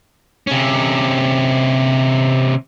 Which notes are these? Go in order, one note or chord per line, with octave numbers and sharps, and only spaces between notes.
C3 C#4